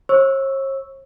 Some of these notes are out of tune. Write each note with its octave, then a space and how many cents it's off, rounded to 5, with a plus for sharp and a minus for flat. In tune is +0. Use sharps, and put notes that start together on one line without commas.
C#5 -45 C#6 +0 E6 +0